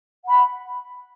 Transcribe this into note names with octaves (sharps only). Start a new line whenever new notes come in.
F#5 B5